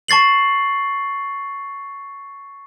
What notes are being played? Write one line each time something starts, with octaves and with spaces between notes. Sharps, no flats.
A5 C#6 A6 C7 F#7